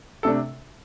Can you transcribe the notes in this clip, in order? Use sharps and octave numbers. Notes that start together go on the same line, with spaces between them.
C3 A3 D4 A4